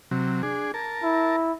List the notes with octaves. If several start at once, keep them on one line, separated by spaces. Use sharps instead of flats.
C3 F#3
D4 G#4
A#4 A5
E4